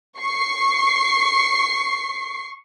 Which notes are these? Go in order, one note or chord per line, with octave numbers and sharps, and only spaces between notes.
C#6 C7